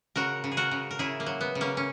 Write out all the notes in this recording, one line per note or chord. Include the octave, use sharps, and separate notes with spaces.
C#3 F#4 A#4
C#3
G#4
F#4 A#4
C#3
A#4
C#3 E4 G#4
A#3
F#3
B3
C#3
A#3 C#4
C#4